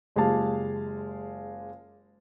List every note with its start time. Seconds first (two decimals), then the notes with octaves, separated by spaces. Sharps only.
0.16 F#1 G#3 F4 G4 F5 A5